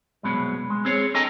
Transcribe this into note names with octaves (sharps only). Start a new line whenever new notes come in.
C2 F#2 B2 G#3 B3
G#3
C4 G#4 C#5
D4 A4 D#5 G5 G#5 A#5